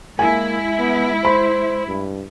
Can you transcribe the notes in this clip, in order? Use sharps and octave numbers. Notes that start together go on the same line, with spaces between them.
G#3 A#3 E4 G#5
B3
C5 B5
G2